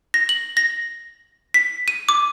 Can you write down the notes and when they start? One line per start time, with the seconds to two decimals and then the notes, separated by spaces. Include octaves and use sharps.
0.14 A#6
0.29 F#7
0.57 A#6
1.54 B6
1.88 D#7
2.09 D6